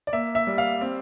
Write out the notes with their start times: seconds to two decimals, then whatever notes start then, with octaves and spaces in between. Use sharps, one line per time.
0.07 D5
0.13 A#3 E5
0.35 E5
0.47 G3
0.58 F5
0.81 C4